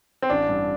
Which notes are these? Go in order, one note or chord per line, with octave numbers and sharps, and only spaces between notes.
C4
A1 D4
G2